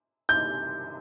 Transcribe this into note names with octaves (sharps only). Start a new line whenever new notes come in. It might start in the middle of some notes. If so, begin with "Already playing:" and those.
G6